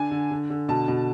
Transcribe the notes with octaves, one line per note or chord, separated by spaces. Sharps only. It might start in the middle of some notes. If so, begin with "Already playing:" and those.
Already playing: D3 D4 G#5
D3
D3
D3
B2 A5
B2